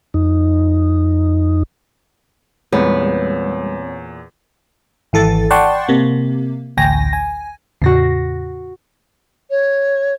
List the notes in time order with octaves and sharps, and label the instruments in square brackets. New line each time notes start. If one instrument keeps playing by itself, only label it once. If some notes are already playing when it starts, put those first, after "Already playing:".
[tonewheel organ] F2 D#4
[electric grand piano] E2 A#2 [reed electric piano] G3 G#3 [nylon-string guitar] B3 [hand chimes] C4 C#5
[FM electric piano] G#1 E3 A4 A6
D5 F#5 G5 A5 C6 C#6
C3 A#3
A1 D2 G5 G#5 A#6
G#5
[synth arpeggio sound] E2 A2 C#3 [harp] F#4 A#6 C7
[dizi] C#5